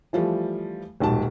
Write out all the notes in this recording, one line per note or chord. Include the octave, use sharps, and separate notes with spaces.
E3 F3 G3 A3
D#1 B1 G#2 A5